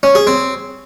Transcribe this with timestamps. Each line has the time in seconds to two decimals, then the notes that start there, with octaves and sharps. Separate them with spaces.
0.03 C#4
0.15 G#4
0.27 C4